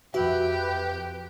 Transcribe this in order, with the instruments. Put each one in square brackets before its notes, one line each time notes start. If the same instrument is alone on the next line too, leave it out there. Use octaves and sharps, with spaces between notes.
[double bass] F2 [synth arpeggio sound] F#4 E5 [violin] G4 [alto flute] B4